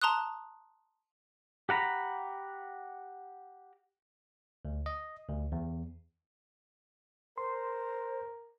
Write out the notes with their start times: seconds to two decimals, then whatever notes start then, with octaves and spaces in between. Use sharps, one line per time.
0.02 A5 A#5 C6 D#6 F#6
1.69 G4 F#5 A#5 B5
4.65 D2
4.86 D#5
5.28 D2
5.52 E2
7.38 A#4 C5 C6